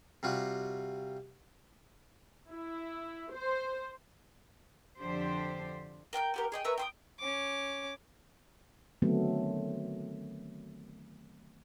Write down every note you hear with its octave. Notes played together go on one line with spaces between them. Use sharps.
C3 G3 F4 F#4
E4
C5
F2 D3 F3 D4 G4 C5
A#4 G5 F6 G6
B3 G4 A#4
G#4 D#5 G5
A#4 B4 C#5 E5
G5 C6 D#6
C#4 D6
D3 D#3 F#3 A3 B3 C4